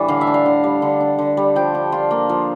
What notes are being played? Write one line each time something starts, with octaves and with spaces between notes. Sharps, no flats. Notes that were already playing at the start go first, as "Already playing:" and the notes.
Already playing: A2 E3 G3 D4
D3 F5
E5
D4
F5
D3
G3
D3
D4
D3
G3
F3 G5
D4
F4
A#3
F3